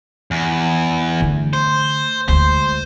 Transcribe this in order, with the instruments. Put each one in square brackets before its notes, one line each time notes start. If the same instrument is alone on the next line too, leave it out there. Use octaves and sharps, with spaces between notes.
[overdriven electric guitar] E2
[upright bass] D3 A3
[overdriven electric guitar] C5
[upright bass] D2 G#3 [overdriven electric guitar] C5